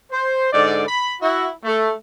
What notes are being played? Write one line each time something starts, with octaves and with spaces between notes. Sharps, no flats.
C5
G#2 D3 D5
B5
E4 F#4
A3